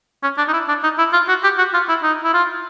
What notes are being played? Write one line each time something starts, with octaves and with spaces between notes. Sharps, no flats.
C#4
D4
D#4
E4
D4
D#4
E4
F4
F#4
G4
F#4
F4
E4
D#4
E4
F4